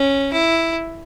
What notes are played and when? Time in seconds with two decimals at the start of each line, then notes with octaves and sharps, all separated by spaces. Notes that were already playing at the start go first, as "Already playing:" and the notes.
Already playing: C#4
0.33 E4